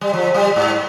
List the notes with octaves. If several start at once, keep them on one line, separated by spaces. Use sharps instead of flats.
G3
F3
G3
G#2